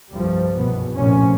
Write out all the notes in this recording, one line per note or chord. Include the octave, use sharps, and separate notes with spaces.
F1 C2 G2 F3 G3
F#1 G2 B2 B3
F1 A#1 A2 C3 F3 C#4